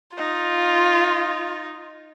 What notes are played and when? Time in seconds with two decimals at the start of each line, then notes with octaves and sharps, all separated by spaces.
0.17 D#4 F4